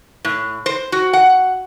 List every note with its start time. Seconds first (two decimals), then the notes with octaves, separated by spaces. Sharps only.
0.25 A2
0.66 C5
0.92 F#4
1.13 F#5